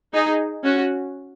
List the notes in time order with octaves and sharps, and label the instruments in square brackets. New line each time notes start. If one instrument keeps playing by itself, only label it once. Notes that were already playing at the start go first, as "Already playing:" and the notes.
[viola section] D#4 G#4
C#4 F#4